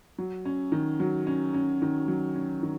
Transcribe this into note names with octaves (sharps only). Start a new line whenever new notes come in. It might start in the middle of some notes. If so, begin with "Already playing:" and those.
F#3
C#4
D#3
F#3
C#4
C#4
D#3
F#3
C#4
D#3